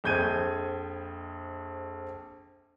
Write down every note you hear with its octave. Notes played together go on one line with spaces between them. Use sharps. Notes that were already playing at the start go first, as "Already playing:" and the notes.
A#1 F2 G6 G#6 D#7